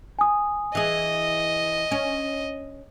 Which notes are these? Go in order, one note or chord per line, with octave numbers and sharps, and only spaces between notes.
G#5 D#6
E3 G#4 D#5
C#4